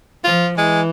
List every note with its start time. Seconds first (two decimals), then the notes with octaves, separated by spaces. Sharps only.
0.24 F3 F4
0.58 E3 G#3